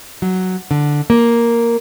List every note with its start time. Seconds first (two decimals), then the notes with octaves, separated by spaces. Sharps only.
0.22 F#3
0.71 D3
1.10 A#3